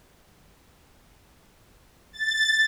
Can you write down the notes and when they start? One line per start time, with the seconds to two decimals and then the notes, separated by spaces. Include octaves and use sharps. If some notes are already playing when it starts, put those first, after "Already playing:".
2.13 A6